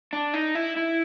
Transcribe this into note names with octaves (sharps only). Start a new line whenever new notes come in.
D4
D#4
E4
E4